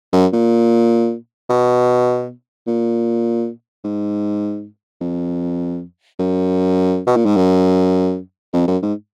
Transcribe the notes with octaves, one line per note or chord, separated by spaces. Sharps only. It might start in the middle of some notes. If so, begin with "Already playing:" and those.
F#2
A#2
B2
A#2
G#2
F2
F#2
B2
A#2
G#2
F#2
F2
F#2
G#2